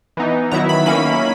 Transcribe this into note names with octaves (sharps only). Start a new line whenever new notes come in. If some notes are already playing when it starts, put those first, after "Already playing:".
E3 B3 D#4
D#3 F#3 B3 E4 A#5
B5
D#3 A#3 C#4 E4 B5